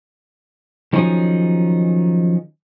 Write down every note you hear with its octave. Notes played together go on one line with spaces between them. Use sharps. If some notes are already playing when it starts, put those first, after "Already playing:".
D#3 F3 F#3 C#4 D#4 G#4